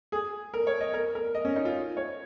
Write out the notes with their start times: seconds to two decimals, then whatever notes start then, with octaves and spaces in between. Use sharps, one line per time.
0.12 G#4
0.54 A#4
0.67 C#5
0.81 D#5
0.94 A#4
1.15 A#4
1.35 D#5
1.45 C#4
1.56 D#4
1.65 F4
1.97 C#5